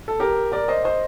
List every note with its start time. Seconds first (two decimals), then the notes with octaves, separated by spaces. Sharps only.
0.08 A4
0.20 G4 A#4
0.52 A#4 D5
0.68 C5 D#5
0.84 C5 D#5